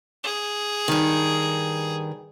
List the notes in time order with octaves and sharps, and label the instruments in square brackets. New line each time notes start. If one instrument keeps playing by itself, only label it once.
[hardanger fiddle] G#4
[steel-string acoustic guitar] G2 D#3